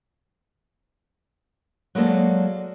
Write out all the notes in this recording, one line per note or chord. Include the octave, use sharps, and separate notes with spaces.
F#3 G#3 A#3 A4 D5